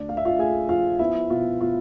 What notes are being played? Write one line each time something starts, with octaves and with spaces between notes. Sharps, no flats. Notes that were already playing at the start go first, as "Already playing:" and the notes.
Already playing: D2 D4 D5
A3 F5
E5
F4 F5
A3 G#4 G#5
F3 F4 F5
B3 E4 E5
B2 F4
B2 F4